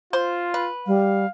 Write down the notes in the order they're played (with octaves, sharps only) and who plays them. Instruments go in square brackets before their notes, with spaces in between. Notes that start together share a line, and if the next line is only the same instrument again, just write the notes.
[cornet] F4 [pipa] C5
[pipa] B4
[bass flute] G3 [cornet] F5